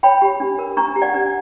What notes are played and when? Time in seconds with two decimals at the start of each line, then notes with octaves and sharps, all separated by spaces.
0.03 C#5 G5 B5
0.22 G4
0.40 D4
0.59 A#4
0.77 D4 A#5 C#6
0.96 G4
1.02 D5 F#5
1.14 D4